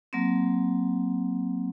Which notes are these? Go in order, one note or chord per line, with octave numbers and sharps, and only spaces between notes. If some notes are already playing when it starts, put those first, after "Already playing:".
F#3 A#3 C4